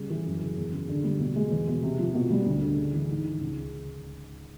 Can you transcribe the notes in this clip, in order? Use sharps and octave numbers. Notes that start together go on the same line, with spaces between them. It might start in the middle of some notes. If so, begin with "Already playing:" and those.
Already playing: C#3 G3
E3
F#2
C#3
E2
C#3
D3
G3
B2
G#3
E2
B2
C3
F3
B2
G3
D2
D3
C#3
E3
G#2
D#3
C#2
C#3